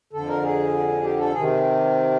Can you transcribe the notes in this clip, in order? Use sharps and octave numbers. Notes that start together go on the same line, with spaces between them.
F2 D3 A4
A#4
G#4
G4
A4
C3 D#3 G#4